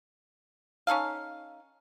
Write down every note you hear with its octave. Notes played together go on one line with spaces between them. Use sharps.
C#4 D#4 A4 F5